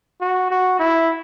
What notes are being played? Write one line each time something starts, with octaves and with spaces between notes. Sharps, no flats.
F#4
F#4
E4